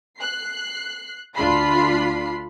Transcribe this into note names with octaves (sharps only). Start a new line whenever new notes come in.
F#6 C7
D2 D4 F4 B5 C7